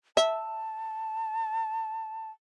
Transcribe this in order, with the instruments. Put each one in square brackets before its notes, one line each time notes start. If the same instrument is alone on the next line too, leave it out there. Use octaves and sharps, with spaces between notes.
[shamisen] E5 [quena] A5